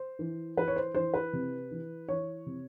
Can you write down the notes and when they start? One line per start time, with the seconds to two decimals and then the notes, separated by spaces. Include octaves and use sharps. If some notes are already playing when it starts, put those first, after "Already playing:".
Already playing: C5
0.19 E3
0.57 E3 B4
0.68 C#5
0.76 C5
0.95 E3 C5
1.14 B4
1.33 C3
1.71 E3
2.08 E3 C#5
2.46 C3